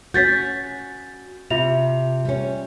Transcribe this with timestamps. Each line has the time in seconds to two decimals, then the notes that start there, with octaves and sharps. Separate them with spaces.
0.14 C#4 F#4 G6 A6 B6
1.50 C3 F4 E5 F7
2.25 G3 C#4